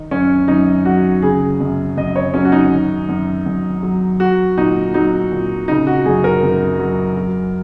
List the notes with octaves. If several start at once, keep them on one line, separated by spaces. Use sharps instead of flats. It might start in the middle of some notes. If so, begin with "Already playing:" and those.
Already playing: D#3 D#4
F#2 C#4
F#2 D#4
F#3 F#4
C#3 G#4
F#2
F#2 D#5
C#5
F#3 C#4
F#4
D#4
D#3
F#2
F#2
F#3
F#3 F#4
A#2 D#4
F#3 D#4
A#2
C#3 D#4
F#4
F#2 G#4
A#4
F#2
F#3
F#3